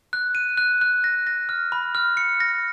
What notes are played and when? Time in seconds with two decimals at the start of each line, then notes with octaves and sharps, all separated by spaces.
0.13 F#6
0.35 D#7
0.57 F#6
0.81 F#6
1.04 A#6
1.27 A#6
1.49 F6
1.72 B5
1.95 F6
2.17 C#7
2.40 A#6